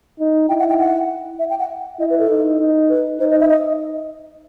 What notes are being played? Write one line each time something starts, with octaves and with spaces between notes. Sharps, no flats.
D#4
E4 G5
F#5
G5
F#5
E5
G5
F#5
E4 D#5
B4
A4
D#4
D#4
B4
D#4 C5
D#5
E5
D#5